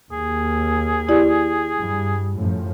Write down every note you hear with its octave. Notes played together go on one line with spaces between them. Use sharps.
D#2 G#4
E4 G4 D5
G2
F#2 A2 F3